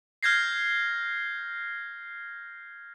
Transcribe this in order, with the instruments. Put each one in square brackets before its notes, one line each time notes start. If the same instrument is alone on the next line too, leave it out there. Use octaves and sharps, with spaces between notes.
[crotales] F6 G6 G#6 A#6 C7